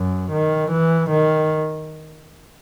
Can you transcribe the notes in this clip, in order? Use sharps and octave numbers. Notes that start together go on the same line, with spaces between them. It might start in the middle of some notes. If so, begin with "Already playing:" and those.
Already playing: F#2
D#3
E3
D#3